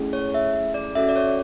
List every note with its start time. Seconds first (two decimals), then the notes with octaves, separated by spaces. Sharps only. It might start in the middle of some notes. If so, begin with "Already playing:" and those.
Already playing: A3 C#4 E4 G#4
0.13 C#5
0.34 E5
0.74 D5
0.95 C#4 F#4 A4 E5
1.09 D5
1.16 C#5